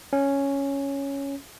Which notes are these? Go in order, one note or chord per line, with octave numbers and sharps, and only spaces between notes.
C#4